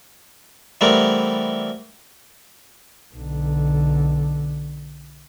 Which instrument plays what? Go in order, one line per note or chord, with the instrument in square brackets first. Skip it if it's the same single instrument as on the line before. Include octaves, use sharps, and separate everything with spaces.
[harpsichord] E3 G3 A3 B3 C4 A#4
[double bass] B1 D3